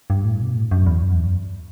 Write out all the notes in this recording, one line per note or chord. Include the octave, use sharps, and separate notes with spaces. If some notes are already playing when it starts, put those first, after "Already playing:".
G2
A2
B2
A2
F#2
E2
F#2
E2
F#2